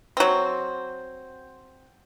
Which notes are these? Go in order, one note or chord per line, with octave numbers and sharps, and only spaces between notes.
F#3 C4